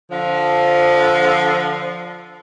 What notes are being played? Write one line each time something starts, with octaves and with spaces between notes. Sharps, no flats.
D3 F3